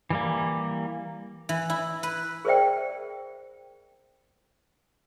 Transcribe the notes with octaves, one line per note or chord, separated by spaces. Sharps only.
E3 G3 A#3
E3
E4
B4
G#4 A#4 C5 D5 E5 G5